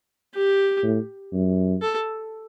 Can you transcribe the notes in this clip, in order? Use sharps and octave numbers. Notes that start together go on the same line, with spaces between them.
G4
A2
F#2
A4